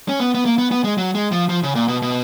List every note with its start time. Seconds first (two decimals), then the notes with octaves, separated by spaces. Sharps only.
0.09 C#4
0.20 B3
0.35 B3
0.45 A#3
0.58 B3
0.71 B3
0.84 G#3
0.98 F#3
1.15 G#3
1.32 F3
1.49 F3
1.63 C#3
1.75 A#2
1.88 B2
2.02 B2